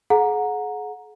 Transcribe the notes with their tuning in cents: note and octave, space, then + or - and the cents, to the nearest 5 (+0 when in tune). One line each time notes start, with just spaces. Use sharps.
G#4 +40 F#5 -25 A#5 +0